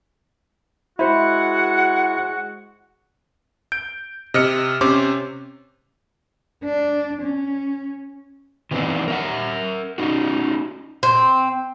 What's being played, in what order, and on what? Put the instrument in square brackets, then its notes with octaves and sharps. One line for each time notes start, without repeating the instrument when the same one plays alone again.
[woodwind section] G#3 F#4 F#5 [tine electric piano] E4 C5
[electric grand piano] G6 D7
C3 D#5 F6 C#7
C3 C#4 C5 D6
[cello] D4
C#4
[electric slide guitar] D#3 E3 B3 C4 D4 D#4
A#4 E5 F#5
C#4 D#4 F#4
[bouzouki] C4